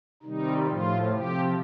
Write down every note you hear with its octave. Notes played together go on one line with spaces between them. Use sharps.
C3 D#3 G3 D#4
A2 F3 F4
C3 F3 G4